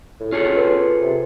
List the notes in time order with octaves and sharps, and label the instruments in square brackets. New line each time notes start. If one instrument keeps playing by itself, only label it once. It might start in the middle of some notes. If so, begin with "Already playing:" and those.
[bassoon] A2
[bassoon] C#4 [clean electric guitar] F4 G#4 A4
[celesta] B4
[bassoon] C3